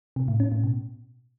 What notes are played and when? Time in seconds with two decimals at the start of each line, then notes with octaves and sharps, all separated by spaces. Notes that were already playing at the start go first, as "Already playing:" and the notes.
0.16 C3
0.28 A2
0.40 C#4
0.52 A2
0.64 B2